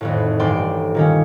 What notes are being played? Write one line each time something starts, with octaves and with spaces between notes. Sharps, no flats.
G#1 F2 A2
D#1 A1 G2 D5 G5 C6
A#2 D#3 C#4